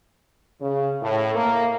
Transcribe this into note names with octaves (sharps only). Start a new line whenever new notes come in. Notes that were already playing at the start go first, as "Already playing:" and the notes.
C#3
A2
A#3